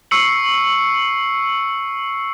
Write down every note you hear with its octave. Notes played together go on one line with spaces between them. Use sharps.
C#6 E6 C7 C#7 F#7